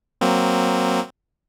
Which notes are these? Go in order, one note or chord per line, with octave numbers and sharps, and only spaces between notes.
F#3 A#3 C4